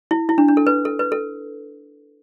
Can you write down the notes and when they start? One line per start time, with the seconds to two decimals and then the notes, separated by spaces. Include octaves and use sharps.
0.11 E4
0.29 E4
0.38 D4
0.48 D4
0.57 A4
0.67 B4
0.85 A4
0.99 B4
1.12 A4